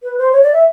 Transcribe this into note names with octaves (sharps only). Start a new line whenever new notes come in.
B4
C5
C#5
D5
E5